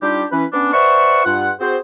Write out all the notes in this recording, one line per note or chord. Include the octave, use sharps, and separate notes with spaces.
G3 D4 D#4 F4 G4
E3 C#4 B4
B3 C#4 D4
B4 C5 D5 E5 F#5 C#6
G2 F4 F#5
C4 F#4 G#4 C5